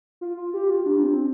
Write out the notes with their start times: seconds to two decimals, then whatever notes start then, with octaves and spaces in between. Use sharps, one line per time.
0.21 F4
0.37 F4
0.54 G4
0.70 F4
0.86 D4
1.03 C4